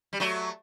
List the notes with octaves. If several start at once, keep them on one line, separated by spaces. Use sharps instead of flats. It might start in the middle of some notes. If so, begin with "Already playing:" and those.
G3
F#3 A3